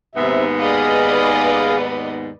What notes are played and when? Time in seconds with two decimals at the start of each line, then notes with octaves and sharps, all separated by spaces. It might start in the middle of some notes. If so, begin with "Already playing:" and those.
0.15 D#2 G#2 C3 B3 E5
0.61 G#4 B4 D5 D#5 F5